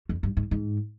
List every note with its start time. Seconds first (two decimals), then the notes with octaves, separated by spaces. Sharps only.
0.09 F2
0.23 G2
0.37 G#2
0.51 G#2